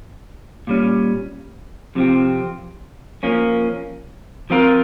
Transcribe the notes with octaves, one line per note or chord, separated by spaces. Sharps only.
A#2 G3 C#4
F2 C3 F3 C4
F3 A#3 C#4
F3 C4 F4 A#4